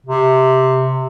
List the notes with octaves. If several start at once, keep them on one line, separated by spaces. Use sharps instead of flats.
C3